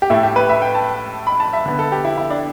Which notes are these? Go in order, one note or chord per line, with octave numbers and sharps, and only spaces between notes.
G4
A2 A3 E4
G4
B4
E5
G5
A5
B5
A5
E5
D3 B3
A4
G4
E4
E4
D4